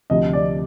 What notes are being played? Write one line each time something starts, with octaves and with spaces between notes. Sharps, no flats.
D2 C3 F3 D#5
D5